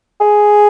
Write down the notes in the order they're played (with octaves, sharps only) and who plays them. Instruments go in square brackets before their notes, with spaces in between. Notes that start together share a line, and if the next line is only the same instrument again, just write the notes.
[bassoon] G#4